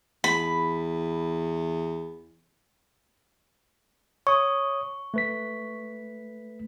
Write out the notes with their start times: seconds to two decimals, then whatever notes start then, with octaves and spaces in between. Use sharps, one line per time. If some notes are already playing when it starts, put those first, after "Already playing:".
0.24 E2 B5
4.27 C#5 C#6 D#6
5.14 A3 B4 B6